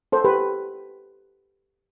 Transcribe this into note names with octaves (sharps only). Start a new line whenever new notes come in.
A4 C5
G4 B4